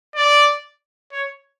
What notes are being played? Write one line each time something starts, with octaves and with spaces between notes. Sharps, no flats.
D5
C#5